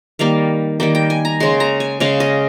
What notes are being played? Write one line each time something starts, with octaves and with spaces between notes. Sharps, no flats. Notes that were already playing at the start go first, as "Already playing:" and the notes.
D#3 G3 A#3 F5
D#3 G3 A#3 G5
G5
G#5
A#5
C#3 G#3 C6
A#5
G#5
C#3 G#3 F5
D#5